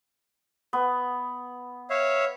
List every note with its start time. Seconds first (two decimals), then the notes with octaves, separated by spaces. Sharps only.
0.73 B3
1.90 C#5 E5 F5